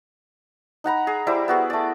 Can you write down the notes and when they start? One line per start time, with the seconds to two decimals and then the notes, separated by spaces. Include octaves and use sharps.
0.84 D#4 F#5 A#5 B5
1.07 G#4
1.27 G3 E4 C5 D6
1.48 B3 F#4 G#4
1.70 A3 D5